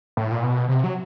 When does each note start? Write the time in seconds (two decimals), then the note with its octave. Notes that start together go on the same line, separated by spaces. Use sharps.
0.17 A2
0.31 A#2
0.43 B2
0.68 C3
0.84 F#3